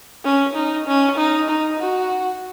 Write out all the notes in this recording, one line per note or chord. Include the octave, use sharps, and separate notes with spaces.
C#4
D#4
C#4
D#4
D#4
F#4